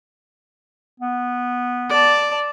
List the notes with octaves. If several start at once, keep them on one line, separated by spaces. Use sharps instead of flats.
B3
D5 A5